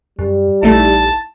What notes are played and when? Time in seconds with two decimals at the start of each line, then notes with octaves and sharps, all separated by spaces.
0.19 F#2 G3
0.63 A#1 A3 D#4 E4 A5